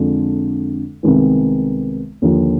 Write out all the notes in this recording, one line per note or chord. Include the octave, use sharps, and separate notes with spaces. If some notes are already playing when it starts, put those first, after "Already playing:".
Already playing: F2 D3 G#3 D4 F4
C2 C3 D#3 G#3 B3
D#2 D3 F3